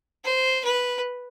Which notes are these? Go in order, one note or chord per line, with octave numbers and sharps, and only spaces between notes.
C5
B4